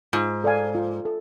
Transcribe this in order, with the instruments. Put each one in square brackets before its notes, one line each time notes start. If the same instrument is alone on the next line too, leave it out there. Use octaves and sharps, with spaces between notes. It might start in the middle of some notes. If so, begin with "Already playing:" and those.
[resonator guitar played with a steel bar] G#2 [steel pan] F4
[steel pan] A4 D5 F5 G#5
F4
A4